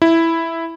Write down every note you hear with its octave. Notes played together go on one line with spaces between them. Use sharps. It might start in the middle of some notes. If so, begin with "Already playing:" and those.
E4